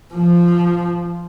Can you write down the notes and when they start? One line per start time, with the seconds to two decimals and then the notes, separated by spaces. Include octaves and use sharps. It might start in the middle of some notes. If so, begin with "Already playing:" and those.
0.14 F3